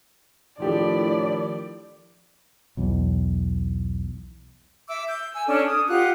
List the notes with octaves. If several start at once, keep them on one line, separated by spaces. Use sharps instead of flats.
A2 D#3 F3 D4 E4 G4 A4 D5
B1 E2
E5 D6 E6
G6
G#5 E6
C#4 D4 A4
D#6
F4 G4 F#5 F#6